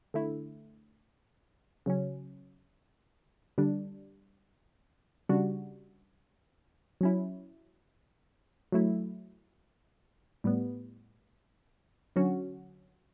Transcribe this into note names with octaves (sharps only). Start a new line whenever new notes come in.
D3 A3 E4
C#3 F#3 C#4
D3 G3 D4
C#3 G3 D4 F#4
F#3 C#4 E4
F#3 A3 E4
A2 G3 B3
D3 F#3 C#4 F#4